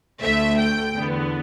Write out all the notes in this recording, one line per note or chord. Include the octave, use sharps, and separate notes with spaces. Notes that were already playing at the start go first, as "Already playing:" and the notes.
D2 D3 A3 E5
G5
E2 D3 B3